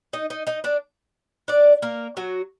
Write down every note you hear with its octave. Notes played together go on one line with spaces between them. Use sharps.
D#4 D#5
D#4 D#5
D#4 D#5
D4 D5
D4 D5
A#3 A#4
F#3 F#4